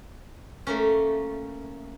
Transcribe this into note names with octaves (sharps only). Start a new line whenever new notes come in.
A3 A#3 C#4